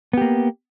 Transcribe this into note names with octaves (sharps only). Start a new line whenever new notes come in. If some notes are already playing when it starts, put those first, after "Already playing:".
A#3 B3 G4